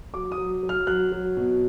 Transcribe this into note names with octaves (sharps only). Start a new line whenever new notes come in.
F#3 D6
D#6
F#3
F#3
F6
F#3 F#6
F#3
B2